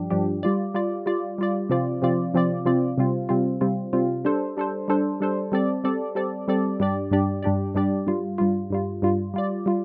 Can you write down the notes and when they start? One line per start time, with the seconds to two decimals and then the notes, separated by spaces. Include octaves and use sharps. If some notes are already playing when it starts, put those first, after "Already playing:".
Already playing: G2 F3 D4 G4
0.10 G2 F3 D4 G4
0.43 G3 F4 D5
0.74 G3 F4 D5
1.06 G3 F4 D5
1.38 G3 F4 D5
1.70 C3 F3 C4 F4 D5
2.02 C3 F3 C4 F4 D5
2.34 C3 F3 C4 F4 D5
2.65 C3 F3 C4 F4 D5
2.98 C3 G3 C4 F4
3.29 C3 G3 C4 F4
3.61 C3 G3 C4 F4
3.93 C3 G3 C4 F4
4.25 G3 D4 A4 C5
4.57 G3 D4 A4 C5
4.88 G3 D4 A4 C5
5.21 G3 D4 A4 C5
5.52 G3 C4 A4 D5
5.84 G3 C4 A4 D5
6.15 G3 C4 A4 D5
6.48 G3 C4 A4 D5
6.80 G2 G3 D4 G4 D5
7.11 G2 G3 D4 G4 D5
7.43 G2 G3 D4 G4 D5
7.75 G2 G3 D4 G4 D5
8.07 G2 G3 F4
8.38 G2 G3 F4
8.70 G2 G3 F4
9.02 G2 G3 F4
9.34 G3 F4 D5
9.66 G3 F4